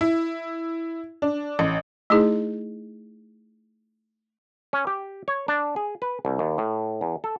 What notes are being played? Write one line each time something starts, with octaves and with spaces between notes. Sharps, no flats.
E4
D4
A1
A3 D#4 E4 G#4
C#4
G4
C#5
D4
G#4
B4
C2
D#2
A2
E2
A4